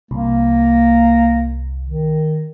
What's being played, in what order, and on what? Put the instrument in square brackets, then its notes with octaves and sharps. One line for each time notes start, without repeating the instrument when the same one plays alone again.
[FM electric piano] C2 [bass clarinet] A#3
[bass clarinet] D#3